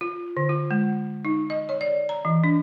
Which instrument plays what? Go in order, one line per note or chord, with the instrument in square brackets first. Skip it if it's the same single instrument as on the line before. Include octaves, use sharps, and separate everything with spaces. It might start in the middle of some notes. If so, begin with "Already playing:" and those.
[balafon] F4
D3
F4
G#3
D#4
D#5
C#5
D5
A#5
E3
D4